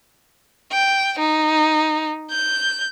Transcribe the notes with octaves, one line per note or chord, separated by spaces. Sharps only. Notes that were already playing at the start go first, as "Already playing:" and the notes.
G5
D#4
G6